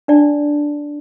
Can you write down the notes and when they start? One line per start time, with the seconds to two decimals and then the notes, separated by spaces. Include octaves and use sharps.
0.08 D4 D5 A5